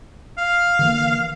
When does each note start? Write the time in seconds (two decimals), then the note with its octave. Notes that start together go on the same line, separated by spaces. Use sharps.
0.38 F5
0.79 D3 E3 A#3